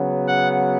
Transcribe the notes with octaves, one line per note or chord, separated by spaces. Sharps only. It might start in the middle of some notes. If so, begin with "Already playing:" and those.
Already playing: C#3 F#3 B3
F#5